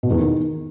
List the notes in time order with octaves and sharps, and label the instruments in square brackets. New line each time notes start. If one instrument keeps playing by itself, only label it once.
[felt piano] B2
E2
D#3